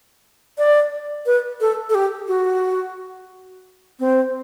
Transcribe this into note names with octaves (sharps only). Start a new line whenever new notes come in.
D5
B4
A4
A4
G4
F#4
C4